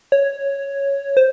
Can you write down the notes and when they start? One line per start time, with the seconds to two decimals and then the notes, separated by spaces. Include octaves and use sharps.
0.12 C#5
1.17 C5